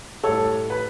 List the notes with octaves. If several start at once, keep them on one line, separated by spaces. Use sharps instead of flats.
A2 G3 A4 C#5
B4